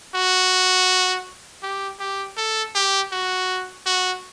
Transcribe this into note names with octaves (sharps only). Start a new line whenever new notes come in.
F#4
G4
G4
A4
G4
F#4
F#4